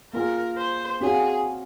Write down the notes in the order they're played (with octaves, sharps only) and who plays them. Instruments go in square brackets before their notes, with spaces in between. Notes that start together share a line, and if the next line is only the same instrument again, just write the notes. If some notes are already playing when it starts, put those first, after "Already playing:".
[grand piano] A#3 F4 G#4 [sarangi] A#4
[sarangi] C5
[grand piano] C4 F#4 C#5 F5 [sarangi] G#4